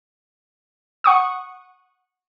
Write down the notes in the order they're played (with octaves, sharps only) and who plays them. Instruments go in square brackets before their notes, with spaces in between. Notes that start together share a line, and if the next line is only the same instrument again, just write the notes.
[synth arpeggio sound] F#5 C#6 D#6